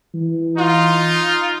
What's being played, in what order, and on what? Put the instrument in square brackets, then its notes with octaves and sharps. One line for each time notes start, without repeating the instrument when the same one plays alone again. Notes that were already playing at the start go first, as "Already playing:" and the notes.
[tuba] E3
[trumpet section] D#4 F4